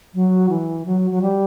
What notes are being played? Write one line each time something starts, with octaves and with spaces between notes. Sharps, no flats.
F#3
E3
F#3
F#3
G3